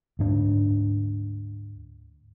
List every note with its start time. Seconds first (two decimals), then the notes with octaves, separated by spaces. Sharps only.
0.19 D2 G#2 D4